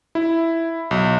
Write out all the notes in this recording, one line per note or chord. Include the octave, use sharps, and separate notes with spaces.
E4
B1